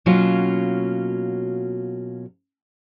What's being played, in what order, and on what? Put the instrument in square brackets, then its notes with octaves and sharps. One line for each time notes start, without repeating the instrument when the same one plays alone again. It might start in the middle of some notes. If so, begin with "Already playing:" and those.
[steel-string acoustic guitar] B2 F#3 A#3 C#4 F4